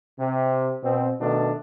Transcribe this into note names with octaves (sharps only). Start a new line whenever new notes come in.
C3
B2 C4
B2 D#3 A3 D4